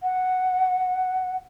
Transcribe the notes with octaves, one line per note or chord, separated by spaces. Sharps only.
F#5